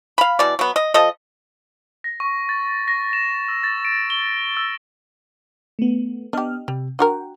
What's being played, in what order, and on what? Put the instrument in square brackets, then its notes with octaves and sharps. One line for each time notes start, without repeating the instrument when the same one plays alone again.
[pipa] F5 B5
B2 E3 D5
F#3 B3
D#5
F3 A4 D#5
[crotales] A#6
C#6
A6
A#6
E7
E6
A6
D7
G7
E6
[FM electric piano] A3 B3
[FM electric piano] B3 D#5 F6 [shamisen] D4 G4
[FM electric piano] C3 [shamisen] G3
[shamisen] D4 F#4 A#4 [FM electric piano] F#5 G5